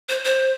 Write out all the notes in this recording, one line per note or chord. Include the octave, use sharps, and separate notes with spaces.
C5
C5